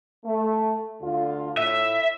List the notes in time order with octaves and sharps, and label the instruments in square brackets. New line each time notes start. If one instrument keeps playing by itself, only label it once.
[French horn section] A3
D2 D3 F4
[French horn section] A2 [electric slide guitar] E5